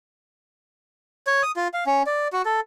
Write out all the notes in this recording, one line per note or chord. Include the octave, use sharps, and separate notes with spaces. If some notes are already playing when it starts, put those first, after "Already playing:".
C#5
D#6
F4
F5
C#4
D5
F#4
A4